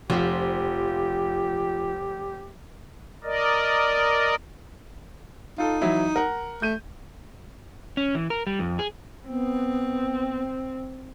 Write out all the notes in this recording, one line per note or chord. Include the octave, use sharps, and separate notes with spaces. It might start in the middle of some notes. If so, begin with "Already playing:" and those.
F1 F3 G4
A#4 D5 D#5
D#4 F4 A4
E3 F#3 E4
A#4 F#5
A3 G6 D#7
C#4
E3
A#4
G3
F2
G#4
B3 C4